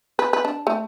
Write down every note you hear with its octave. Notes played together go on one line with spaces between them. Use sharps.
B4
B4
D4
A3